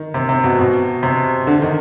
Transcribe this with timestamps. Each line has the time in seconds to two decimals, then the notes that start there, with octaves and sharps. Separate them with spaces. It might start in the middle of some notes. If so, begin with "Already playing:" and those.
Already playing: D#3
0.14 C3
0.29 C3
0.44 B2
0.59 B2
1.03 C3
1.47 D3
1.62 D#3